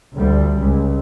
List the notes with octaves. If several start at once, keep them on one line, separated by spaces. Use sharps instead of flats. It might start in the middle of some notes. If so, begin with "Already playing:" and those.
D2 G3
C#2